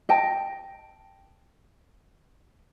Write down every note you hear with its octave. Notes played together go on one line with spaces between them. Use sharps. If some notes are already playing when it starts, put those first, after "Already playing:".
D#5 G5 A5